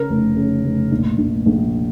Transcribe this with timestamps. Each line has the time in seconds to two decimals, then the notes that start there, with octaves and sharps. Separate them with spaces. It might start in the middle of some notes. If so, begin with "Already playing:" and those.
Already playing: C#3 A#4
0.10 F1
0.36 C#3
0.64 F1
0.92 A#1
1.18 A#1
1.46 A#1